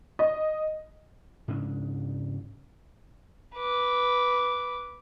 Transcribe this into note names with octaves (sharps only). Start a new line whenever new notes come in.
D#5
G#2 C#3 D4
B4 D6